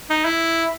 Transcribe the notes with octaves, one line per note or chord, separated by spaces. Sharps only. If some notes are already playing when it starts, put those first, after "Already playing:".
D#4
E4